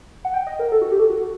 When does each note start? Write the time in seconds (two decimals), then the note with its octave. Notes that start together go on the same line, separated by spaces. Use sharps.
0.25 F#5
0.34 G5
0.47 D#5
0.59 A#4
0.72 A4
0.82 F#4
0.91 G4
1.00 A4
1.09 F#4